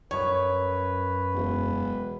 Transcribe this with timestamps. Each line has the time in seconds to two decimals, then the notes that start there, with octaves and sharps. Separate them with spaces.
0.11 F#2 B4 C#5
1.34 E1